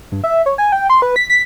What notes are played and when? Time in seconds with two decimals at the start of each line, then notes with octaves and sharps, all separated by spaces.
0.12 G2
0.24 E5
0.46 C#5
0.58 G#5
0.72 G5
0.90 C6
1.02 B4
1.16 B6
1.30 B6